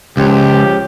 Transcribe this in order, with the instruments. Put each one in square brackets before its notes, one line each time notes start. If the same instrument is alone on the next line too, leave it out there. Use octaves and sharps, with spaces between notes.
[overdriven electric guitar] C#2 [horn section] F3 C#4 G4